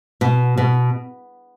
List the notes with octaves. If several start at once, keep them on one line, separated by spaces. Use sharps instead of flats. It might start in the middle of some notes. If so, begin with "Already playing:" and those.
B2
B2